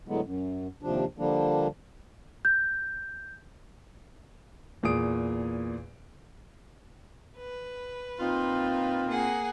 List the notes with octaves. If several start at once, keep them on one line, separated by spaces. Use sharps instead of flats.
A2 D3 F#3 G#3 B3
F#2
D#2 C3 F3 D4
D3 F3 G3 A#3 D4
G6
E2 A#2 G#4 D#6 D7
B4
A#2 C4 D#4 F4
A#3 G#4 F#5